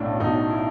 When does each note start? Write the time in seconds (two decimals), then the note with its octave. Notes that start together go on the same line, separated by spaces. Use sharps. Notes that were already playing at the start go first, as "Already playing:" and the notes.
Already playing: B1 A2 C#4 D4
0.20 B1 D#4
0.50 E4